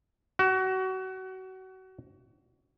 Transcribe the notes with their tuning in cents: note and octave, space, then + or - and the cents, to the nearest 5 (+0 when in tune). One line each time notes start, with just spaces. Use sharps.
F#4 +25